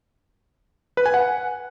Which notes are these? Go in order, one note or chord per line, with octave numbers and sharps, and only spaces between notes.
B4
G#5
F#5